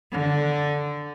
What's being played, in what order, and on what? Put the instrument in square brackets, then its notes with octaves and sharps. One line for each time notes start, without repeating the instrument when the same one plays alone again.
[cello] D3